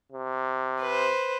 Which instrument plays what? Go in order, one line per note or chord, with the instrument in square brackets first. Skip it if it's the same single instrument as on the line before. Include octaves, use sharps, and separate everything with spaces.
[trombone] C3
[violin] B4 C5